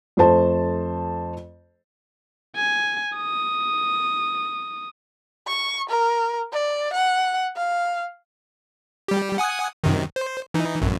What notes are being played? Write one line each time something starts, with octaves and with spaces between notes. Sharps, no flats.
F2 A3 C5 A5
G#5
D#6
C#6
A#4
D5
F#5
F5
G3 G4
F#5 G#5 D#6
F#2 C3 D#3
C5
E3 D#4
A1 F#2